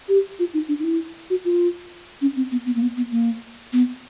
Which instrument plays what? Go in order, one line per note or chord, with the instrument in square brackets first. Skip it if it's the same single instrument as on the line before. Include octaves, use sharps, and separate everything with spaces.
[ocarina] G4
F4
D#4
D4
D#4
E4
F#4
F4
C#4
C4
B3
B3
A#3
B3
B3
A#3
B3